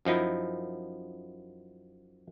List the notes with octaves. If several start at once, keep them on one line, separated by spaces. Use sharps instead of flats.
F#2 F3 D#4 E4